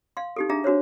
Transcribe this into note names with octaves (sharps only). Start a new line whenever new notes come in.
F5 C6
D#4 G4 A4
D4 G#4 E5 A#5
D4 F#4 C5 C#5